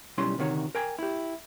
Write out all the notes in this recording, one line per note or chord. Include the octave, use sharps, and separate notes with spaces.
B1 G3 C#4 E4 C6
D2 C3 D#3 F#4 C#5
A#4 G5 G#5
E4 G4